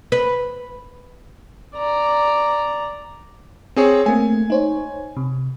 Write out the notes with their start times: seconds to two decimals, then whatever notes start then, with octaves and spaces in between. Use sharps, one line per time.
0.12 B4
1.75 D5 A#5
3.76 C4 G#4 C#5
4.06 A3 A#3 C4 G#5
4.50 D#4 C5 C#5
5.17 C3